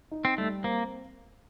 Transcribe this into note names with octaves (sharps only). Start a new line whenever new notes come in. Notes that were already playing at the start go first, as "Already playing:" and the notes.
D#4
C4
G3 A3
A#3 C4